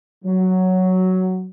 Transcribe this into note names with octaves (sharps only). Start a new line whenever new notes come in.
F#3